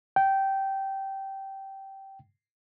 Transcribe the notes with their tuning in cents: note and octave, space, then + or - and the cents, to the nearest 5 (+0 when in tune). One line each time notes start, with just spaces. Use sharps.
G5 -15